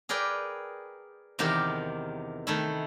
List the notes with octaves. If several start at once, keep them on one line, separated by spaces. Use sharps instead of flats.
G#4 A#4 B4 D5 G5
E2 C3 D#3 G4 A#4
D#3 A3 E4